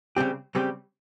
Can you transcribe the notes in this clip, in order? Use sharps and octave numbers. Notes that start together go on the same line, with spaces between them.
C#3 G3 C4 G4
C#3 G3 C4 G4